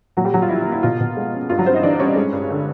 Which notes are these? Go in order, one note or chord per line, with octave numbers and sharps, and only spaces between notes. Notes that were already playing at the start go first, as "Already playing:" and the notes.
A#2 F#3 F#4
G3 G4
A#2 F#3 F#4
F4
F3 E4
E4
A#3
E4
B2 F4
B2
G#3
C#4
G2 F4
F#3 F#4
G2 C4 C5
D#4 D#5
E3 D4 D5
G3 C#4 C#5
G#3
G2
D3